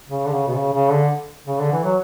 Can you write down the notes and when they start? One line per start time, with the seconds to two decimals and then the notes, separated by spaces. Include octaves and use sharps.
0.09 C#3
0.26 D3
0.32 C#3
0.47 B2
0.55 C#3
0.73 C#3
0.91 D3
1.47 C#3
1.59 D3
1.72 E3
1.84 F#3